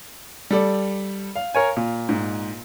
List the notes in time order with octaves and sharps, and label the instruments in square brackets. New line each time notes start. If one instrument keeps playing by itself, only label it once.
[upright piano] G3 A4 D5
F5
[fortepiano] A#4 C#5 G#5
A#2
[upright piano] G#2